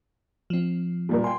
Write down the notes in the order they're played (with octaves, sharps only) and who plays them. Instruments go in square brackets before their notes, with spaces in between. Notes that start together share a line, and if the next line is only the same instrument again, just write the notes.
[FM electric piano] F3 C4
[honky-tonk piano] A#2 G3 A#4
[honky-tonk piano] G5 C6 [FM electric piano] G#5